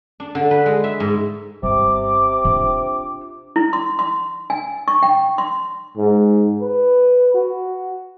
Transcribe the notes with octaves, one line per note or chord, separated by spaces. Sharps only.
D4
D3
B4
G#3
E5
G#2
G1 C3 D6
D4 F4
E4
C6
C6
G#5
C#6
G5
C6
G#2
B4
F#4